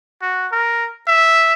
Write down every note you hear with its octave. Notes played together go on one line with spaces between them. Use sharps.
F#4
A#4
E5